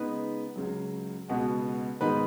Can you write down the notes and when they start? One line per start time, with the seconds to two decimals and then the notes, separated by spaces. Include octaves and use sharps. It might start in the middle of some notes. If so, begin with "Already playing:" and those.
Already playing: C#3 G#3 B3 D#4 B4
0.56 C#2 C#3 F#3
1.29 C#2 B2 B3 F#4
2.01 G#2 D#3 B3 D#4 B4